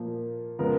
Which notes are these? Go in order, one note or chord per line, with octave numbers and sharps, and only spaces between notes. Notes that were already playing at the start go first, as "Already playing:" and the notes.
Already playing: A#2 F3 A#3
C#3 F3 G#3 B3 A#4